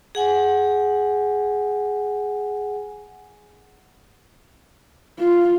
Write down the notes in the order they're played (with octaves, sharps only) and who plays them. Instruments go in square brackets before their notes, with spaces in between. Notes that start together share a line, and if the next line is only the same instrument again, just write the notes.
[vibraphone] G#4 F#5 G#5
[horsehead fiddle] F4